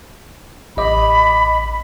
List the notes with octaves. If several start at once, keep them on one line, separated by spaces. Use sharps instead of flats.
A1 D#5 B5 D6